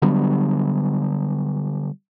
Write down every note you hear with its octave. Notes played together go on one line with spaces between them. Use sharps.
D3 F#3 G3 B3